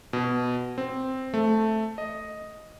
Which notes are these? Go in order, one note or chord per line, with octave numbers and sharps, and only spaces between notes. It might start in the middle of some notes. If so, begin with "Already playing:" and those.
B2
C4
A3
D#5